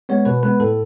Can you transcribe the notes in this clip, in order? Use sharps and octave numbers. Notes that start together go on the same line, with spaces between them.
G#3 B3 C#5
B2 B4
G#3 B3 B4
A2 A4